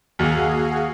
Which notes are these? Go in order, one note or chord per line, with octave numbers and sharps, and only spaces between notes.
D#2 F#4 G#4 F5